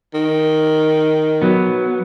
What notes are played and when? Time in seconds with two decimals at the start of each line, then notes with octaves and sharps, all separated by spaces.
0.14 D#3
1.42 F#3 B3